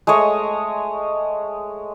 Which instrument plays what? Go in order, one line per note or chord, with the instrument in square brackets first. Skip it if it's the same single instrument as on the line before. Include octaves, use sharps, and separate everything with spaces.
[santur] G#3 A3 C#5 D#5